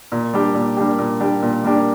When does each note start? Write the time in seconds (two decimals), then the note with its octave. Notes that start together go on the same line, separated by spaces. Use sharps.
0.12 A#2
0.34 G3 A#3 D4 G4
0.55 A#2
0.77 G3 A#3 D4 G4
0.99 A#2
1.20 G3 A#3 D4 G4
1.43 A#2
1.64 G3 A#3 D4 G4